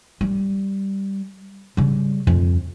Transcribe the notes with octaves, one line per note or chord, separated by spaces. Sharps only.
G3
C#3 G3
F2